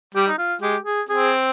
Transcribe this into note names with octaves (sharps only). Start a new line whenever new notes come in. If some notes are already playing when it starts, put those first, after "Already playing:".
G3 G4
D#4
F4
G#3 G4
G#4
C4 G#4